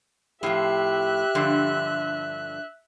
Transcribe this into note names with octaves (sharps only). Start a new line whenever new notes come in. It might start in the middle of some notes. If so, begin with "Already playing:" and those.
A2 F3 G4 E5 F#6
G2 D3 F3